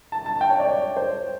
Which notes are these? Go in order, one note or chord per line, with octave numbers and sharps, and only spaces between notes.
A5
A5
G5
C#5
D5
C#5
C5